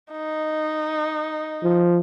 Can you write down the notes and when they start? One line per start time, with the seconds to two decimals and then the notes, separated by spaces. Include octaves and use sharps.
0.12 D#4
1.63 F3